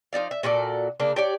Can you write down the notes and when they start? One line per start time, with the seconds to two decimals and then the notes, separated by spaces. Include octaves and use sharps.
0.13 F3 D#4 D5 F5
0.31 E5
0.43 A#2 F#4 A4 D5
1.00 C#3 A#3 D4
1.16 G4 C#5 D5